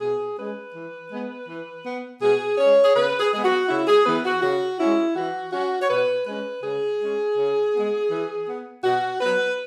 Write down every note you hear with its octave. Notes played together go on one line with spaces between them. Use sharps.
B2 G#4
G#3 C#4 B4
E3
G#3 B3
E3
B3
B2 G#4
G#3 C#4 C#5
G#4
C#3 B4
G#4
G#3 B3 G#4
F#4
C#3 E4
G#4
E3 B3 B4
F#4
C#3 F#4
G#3 C#4 E4
E3 F#4
C#4 F#4
C#5
B2 B4
G#3 C#4 B4
C#3 G#4
G#3 C#4
C#3
G#3 B3
E3
B3
B2 F#4
F#3 B3 B4